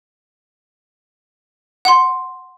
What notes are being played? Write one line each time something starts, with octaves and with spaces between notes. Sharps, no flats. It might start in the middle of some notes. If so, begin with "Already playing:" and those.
F#5 C6